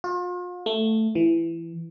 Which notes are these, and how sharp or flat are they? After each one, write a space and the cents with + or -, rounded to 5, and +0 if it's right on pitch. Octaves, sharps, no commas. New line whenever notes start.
F4 +40
A3 +5
E3 +15